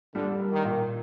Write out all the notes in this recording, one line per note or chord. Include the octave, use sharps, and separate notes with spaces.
D3 G3
A#3
D#3
A#2